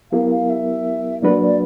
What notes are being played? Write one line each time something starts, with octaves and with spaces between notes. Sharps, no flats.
F#3 B3 E4 G4 A#4 F5
F5
E5
F#3 A#3 D4 F#4 B4 D5
D5